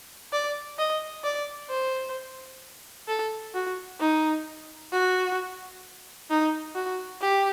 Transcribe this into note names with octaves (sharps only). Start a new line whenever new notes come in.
D5
D#5
D5
C5
A4
F#4
D#4
F#4
D#4
F#4
G4